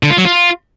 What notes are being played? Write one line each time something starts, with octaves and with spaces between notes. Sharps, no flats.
D3
F4
F#3
F4